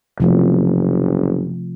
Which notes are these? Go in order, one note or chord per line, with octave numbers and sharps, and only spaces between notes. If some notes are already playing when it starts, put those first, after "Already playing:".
F#1 C3 F3 A3